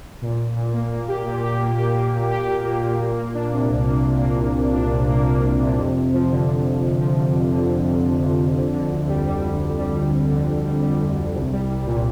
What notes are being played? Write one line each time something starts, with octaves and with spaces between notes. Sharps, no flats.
A#2
A#2
A#2
A#3
A#3
G4
A#2
G4
A#3
G4
A#3
A#2
G4
G4
A#3
A#2
A#3
A#3
D4
C3
C2
A#3
C2
A#3
C2
C2
D4
C3
A#3
A#3
C2
C3
F2
F2
F3
D3
D3
F2
F2
F3
D3
F2
D3
F2
F2
F2
F2
F2
D3
D3
D2
G3
G3
D2
D2
G3
G3
D2
D3
D2
G3
G3
D2
D2
C2
G3
C2
A#2